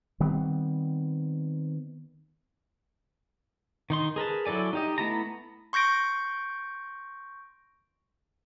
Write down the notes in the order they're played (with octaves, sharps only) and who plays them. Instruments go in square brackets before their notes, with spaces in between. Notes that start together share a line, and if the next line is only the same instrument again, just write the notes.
[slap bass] D#3 G3 B3 C4
[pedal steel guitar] D#3 D#4 C6
G#4 A#4 B4 A5
F#3 E4 A4 D5 G#5
D#4 G4 D#5
A3 B3 E4 A5 A#5
[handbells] C6 C#6 G6 A#6 D7